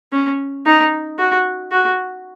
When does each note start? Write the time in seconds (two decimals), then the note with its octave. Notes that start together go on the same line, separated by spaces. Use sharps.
0.12 C#4
0.66 D#4
1.18 F#4
1.72 F#4